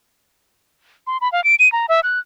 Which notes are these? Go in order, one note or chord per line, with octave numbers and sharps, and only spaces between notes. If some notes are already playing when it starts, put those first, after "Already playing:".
C6
B5
F5
D7
D#7
A#5
E5
F#6